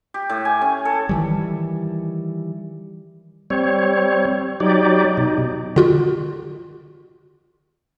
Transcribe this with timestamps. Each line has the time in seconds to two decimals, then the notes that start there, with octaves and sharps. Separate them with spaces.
0.14 G4
0.30 A2
0.45 G#5
0.61 C#4
0.85 A4
1.09 D#3 E3 G3
3.50 G3 C4 C#5
4.60 F#3 D#4 G4 D5
5.17 B2 D#4
5.76 D3 F4 F#4